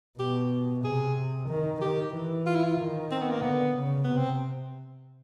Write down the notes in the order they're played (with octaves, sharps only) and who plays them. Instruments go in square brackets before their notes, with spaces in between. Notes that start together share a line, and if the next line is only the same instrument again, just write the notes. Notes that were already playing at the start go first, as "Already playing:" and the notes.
[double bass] B2 [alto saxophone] G4
[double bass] C3 [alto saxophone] G#4
[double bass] D#3
[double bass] D#3 [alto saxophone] G4
[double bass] E3
[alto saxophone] F4
E4
F4
[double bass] D#3
[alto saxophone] C4
B3
A#3
[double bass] D3 [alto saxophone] B3
[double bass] C#3
[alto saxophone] B3
[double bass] C3
[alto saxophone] C4